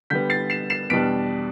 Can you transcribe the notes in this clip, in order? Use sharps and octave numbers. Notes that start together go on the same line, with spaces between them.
D3 G3 B3 G6 B6
A6 C7
C7 E7
C7 E7
E2 B2 G3 D4 B6 D7